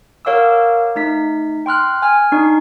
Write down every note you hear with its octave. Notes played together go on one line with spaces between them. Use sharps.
A#4 C#5 F5 F#5 D6 E6
A3 D#4 B6
G5 C6 F6 F#6
G#5 F6
D4 D#4 C#6